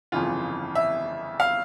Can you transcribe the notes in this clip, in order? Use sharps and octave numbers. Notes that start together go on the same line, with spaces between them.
G1 F2 C#3 E3 F4
E5
F5